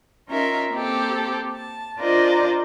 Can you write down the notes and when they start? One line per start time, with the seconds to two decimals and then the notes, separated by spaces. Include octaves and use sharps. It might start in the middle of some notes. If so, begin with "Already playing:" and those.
0.27 C#4 D#4 F4 A#4 E5
0.71 A#3 C4 G4 A4
1.53 A5
1.99 D4 F4 A#4 C5 D5 D#5